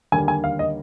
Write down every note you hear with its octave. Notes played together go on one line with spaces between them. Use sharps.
D#2 D3 G3 A#3 G#5
G#5
F5
D#5